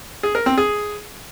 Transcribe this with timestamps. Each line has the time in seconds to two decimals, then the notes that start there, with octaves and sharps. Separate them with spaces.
0.23 G#4
0.35 A#4
0.46 C4
0.58 G#4